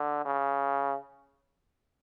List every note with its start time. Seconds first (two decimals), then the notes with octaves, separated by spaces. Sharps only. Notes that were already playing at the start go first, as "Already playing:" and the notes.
Already playing: D3
0.26 C#3